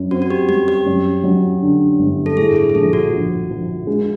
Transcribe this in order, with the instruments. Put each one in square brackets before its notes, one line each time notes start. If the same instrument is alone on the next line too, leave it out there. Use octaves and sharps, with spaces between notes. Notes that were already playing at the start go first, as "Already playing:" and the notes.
Already playing: [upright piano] F#2
[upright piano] C4 [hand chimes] F#4
[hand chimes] F#4
G4
[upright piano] G3 [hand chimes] G4
[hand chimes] G4
[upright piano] F#2
F#3
D3
G1
[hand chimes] A4
[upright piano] A2 [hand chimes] G#4
[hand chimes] G#4
G#4
[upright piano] A#1 [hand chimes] A4
[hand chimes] F#4
[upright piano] F3
F3
G#3